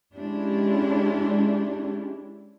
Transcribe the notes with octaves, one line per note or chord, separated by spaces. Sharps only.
G#3 C#4 D4 E4 G4